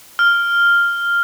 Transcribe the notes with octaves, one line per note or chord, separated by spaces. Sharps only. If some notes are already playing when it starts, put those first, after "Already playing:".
F6